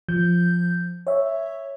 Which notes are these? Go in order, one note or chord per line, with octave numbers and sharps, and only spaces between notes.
F3 G6
C#5 E5